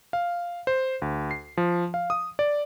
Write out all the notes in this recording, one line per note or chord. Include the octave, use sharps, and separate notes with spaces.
F5
C5
D2
C7
F3
F5
D#6
D5